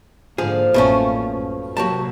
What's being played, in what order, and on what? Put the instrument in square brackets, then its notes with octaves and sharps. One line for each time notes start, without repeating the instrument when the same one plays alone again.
[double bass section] G#2 D3 A#3 [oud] F3 [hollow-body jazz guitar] G#4
[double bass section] A1 F#2 A#3 [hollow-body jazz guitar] B2 A3 C#4
[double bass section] F#2
[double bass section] C3 F#3 A#3 [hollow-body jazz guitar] F#4 G4 A5